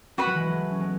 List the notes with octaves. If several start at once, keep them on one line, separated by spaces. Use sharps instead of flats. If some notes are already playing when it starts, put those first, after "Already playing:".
G#3 F#4 B4 F#5 B5
F#3
E3 G#3
F#3 A3
C#4
G#3 B3